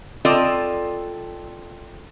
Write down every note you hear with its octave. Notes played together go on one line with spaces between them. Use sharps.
C4 F4 A4 D5 D#5